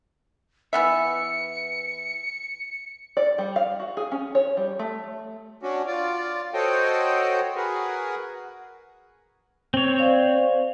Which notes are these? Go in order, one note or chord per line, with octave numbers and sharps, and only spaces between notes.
E3 B3 E5 C#7
D5
G3
F5
F#4
G#4
C#4
C#5
G3
A3
C#4 D4 F#4
F4 D5
F#4 A4 C5 C#5 D#5 G5
F#4 G#4 A#4 B4
C4 C#5
C5 D5 F5